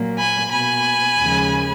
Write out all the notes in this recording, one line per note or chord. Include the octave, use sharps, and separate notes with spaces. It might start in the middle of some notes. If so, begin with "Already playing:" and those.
Already playing: A#2 F#3 A#3
G#5 B5
B2 A#3 G#5 B5
D#2 C#3 F3 G#3